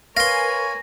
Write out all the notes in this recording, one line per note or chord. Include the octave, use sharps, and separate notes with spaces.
A#4 B4 C#5 F5 G#5 C6 A#6